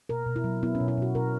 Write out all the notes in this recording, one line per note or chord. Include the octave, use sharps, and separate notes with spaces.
B2 A#4
B2
E4
F#3
B3 E4
C#4
B2
E4
B2 F#4
B2 A#4